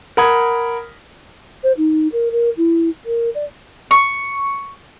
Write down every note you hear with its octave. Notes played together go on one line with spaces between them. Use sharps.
A#4 F#5 B5 D#6 G#6
C5
D#4
A#4
A#4
E4
A#4
D5
C#6